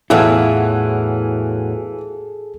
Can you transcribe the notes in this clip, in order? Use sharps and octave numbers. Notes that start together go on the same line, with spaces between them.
E2 A2 E3 F#3 E4 F4 G#4 A4